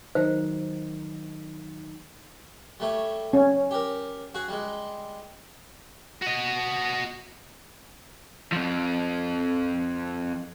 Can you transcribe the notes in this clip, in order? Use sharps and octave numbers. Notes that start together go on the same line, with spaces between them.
D#3 F#3 D#4 C5
G3 A3 C#5
C#4
G4 A#4
F#4 G#4
G3 G#3
F#4 D#5
F2 F3